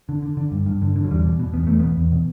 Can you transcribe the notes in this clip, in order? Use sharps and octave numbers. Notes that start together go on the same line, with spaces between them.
D3
D3
D3
G2
G2
D3
D3
F#3
E2 G3
B2
B2
E2 B3
E2 A3
B2 B3
E2
B2